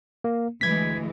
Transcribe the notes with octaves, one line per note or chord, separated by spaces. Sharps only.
A#3
D2 E3 G#3 G#6 B6